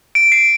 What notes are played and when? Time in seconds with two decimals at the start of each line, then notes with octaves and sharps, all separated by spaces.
0.15 D7
0.32 C7